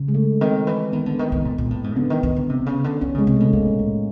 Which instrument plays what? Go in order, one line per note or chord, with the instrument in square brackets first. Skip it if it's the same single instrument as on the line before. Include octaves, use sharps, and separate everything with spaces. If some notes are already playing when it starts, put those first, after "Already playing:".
Already playing: [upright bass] C#3
[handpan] G#3
A3
[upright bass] D#3 [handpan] C4
[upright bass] E3
[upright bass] D#3 [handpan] B3
[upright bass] D3
D#3
D#3
A#2
A#2
A2
G#2
[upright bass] D3 [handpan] B3
[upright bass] D#3
D#3
D3
C3
C#3
D3
[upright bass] D#3 [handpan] C#4
[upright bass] C#3 [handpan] G#3
[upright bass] C3
[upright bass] B2 [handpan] A3
[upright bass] B2 [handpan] A#3
[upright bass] A2